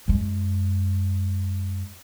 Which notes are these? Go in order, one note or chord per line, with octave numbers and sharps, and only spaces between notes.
F#2 G#3